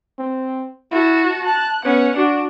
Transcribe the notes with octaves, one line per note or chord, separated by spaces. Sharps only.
C4
E4 F#4 A5
A5 F#6
B3 C#4 F#5
D4 F#4